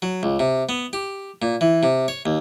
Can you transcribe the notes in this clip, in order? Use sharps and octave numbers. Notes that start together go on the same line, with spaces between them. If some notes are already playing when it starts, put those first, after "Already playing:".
F#3
C#2
C3
B3
G4
A#2
E3
C3
C#5
D#2